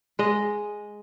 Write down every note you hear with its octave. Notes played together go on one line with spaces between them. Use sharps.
G#3 D#5